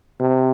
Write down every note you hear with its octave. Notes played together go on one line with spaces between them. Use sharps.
C3